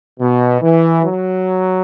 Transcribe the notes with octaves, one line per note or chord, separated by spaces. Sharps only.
B2
E3
F#3